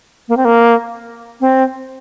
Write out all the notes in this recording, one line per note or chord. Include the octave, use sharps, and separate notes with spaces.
A#3
C4
A#3
C4